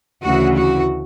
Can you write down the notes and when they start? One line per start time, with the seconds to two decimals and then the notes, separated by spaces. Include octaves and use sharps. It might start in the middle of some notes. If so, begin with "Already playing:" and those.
0.22 D2 C#3 E3 F#4
0.56 F#4